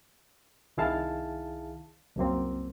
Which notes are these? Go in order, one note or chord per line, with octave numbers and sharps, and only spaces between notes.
C2 D#3 E4 G#4 F5 A5
C2 F#2 A#3 C4